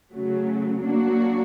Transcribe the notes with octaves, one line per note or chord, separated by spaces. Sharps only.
C#3 F#3 A3
F#3 A#3 D4 F#4